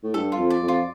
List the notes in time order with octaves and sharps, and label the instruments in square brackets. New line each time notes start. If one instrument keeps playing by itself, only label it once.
[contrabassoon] A2
[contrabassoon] G2 [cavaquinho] A4
[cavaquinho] F4
[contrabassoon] F2
[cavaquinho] D5
[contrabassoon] F2
[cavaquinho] F4